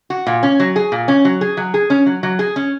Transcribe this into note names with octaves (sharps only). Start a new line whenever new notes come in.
F#4
A#2
C#4
F#3
G#4
A#2
C#4
F#3
G#4
F#3
G#4
C#4
F#3
F#3
G#4
C#4